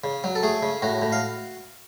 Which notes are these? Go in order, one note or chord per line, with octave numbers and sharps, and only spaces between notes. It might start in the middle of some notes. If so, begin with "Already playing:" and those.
C#3
F#3
A4
A3 G#4
C#3
A2 F#4
A2
F5